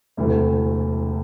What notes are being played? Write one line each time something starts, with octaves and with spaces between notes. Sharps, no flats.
E1 D2 C3 E3 A3